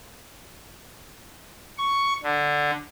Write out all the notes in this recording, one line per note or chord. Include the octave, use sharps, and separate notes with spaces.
C#6
D3